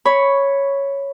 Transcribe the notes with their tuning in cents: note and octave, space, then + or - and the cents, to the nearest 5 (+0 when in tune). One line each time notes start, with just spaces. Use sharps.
C#5 +0 B5 +0